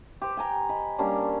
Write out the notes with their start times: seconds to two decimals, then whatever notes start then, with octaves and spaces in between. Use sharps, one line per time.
0.22 G4 C5
0.37 G5 G#5 A#5
0.69 D#5 B5
0.99 G3 A#3 C#4 D4